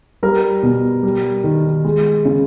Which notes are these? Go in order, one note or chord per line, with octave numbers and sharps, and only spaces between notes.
G3 A#4
B2
G3
D#3
G#3
C#3